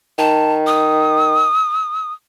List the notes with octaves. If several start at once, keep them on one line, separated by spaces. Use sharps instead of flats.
D#3 A5
D#6